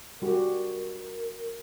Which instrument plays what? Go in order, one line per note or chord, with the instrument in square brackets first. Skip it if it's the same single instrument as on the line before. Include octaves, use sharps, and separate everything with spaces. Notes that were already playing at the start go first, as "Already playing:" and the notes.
[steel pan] G3 F#4 G4 [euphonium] A#4